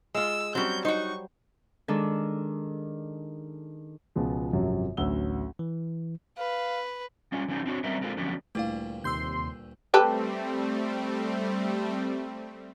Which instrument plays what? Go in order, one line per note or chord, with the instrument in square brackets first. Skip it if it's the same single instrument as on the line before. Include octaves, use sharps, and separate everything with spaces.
[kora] G#3 F4 [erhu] E6
[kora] F#3 G3 [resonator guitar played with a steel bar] C4 C#4 [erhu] G6
[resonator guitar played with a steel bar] D#4 F#4 [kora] C5 [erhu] C#6
[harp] D#3 G#3 D4 A4
[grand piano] C#2 B2 F3 G#3
G#1 F#2 C3 F3 F#3
A1 D2 F#3 F#5 E6 G7
[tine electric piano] E3
[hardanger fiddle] B4 [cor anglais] F5
[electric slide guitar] G3 C#4 F4
E3 F#3 C#4 D#4
C4 D4 F#4 C#5
G3 C4 C#4 A#4 B4 E5
G#3 A#3 C4 F4 A4
D3 F3 F#3 B3 C#4
[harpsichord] D2 G2 A#2 [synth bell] A3 E4 F5
[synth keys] D#2 C3 C6 [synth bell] E6 G6
[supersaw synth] G3 A3 C4 [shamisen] G4 A4 B4